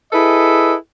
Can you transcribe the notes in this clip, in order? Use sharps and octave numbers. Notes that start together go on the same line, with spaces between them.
E4 G#4 A4 B4 D#5